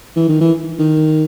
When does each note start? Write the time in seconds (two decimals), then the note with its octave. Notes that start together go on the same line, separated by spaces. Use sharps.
0.16 E3
0.29 D#3
0.41 E3
0.79 D#3